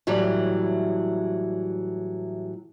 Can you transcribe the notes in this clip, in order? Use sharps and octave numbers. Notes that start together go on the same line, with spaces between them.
A2 E3 F#3 G3